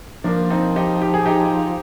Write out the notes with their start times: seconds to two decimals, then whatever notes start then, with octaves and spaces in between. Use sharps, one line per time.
0.24 F3 A#3 D4
0.50 C4 D#4
0.76 D#4 G4
1.02 G4
1.14 G#4
1.26 D#4 G4